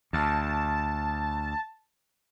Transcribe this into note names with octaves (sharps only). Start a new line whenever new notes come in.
D2 A5